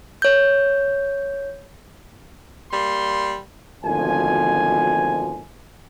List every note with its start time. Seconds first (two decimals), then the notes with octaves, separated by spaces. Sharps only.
0.22 C#5 G6
2.72 G3 A#3 C6
3.84 G#1 D2 B2 F3 G#5